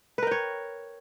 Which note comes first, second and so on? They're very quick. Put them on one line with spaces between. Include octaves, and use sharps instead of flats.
B4 A#4 G5 C#5